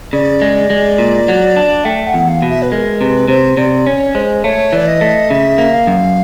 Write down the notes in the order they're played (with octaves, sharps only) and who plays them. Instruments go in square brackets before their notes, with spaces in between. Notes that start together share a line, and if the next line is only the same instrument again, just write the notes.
[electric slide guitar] C#3 [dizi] D5
[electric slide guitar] G#3
G#3
A#2
F#3
D4
[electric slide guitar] A3 [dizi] G5
[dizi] F#5
[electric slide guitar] E2
[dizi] F5
[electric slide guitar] B2
[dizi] E5
B4
[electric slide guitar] G#3 [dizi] A#4
[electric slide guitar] C3 [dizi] B4
[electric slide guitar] C3 [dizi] C5
[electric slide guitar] C3 [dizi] D5
[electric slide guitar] C#4 [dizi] C#5
[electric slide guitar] G#3 [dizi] C5
[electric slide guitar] A3 [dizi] C#5
[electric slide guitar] E3 [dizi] D5
[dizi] D#5
[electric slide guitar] A3
[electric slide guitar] C#3 [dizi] E5
[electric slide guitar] A#3
[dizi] F5
[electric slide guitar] F#2